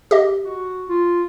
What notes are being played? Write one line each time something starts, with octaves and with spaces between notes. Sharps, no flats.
G4 D#5
F#4
F4